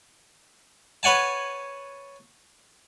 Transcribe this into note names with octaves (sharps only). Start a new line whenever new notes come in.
B4 C#5 F#5 G#5 A5